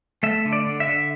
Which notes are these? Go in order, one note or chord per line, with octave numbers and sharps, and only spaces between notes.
A3 E5
D3
D5
D3
E5
D3